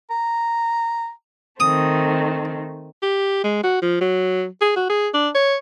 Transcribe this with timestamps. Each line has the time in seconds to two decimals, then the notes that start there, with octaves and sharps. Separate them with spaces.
0.10 A#5
1.60 D#3 A3 C4 D#6
3.03 G4
3.44 G#3
3.64 F#4
3.82 F3
4.01 F#3
4.62 G#4
4.76 F#4
4.90 G#4
5.14 D4
5.35 C#5